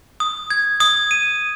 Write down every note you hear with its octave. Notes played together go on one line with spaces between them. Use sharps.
D#6
G#6
D#6
D#7